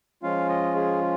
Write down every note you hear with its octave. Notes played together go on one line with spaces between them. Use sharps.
F3 G#3 C#4 F4 F5
D#5
G#4